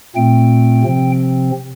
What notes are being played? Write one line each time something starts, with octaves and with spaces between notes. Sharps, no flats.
A#2 A3 C4 G5
C3 F3 C4